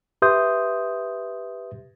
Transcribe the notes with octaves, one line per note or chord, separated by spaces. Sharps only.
G4 B4 E5 C6 D#6 G6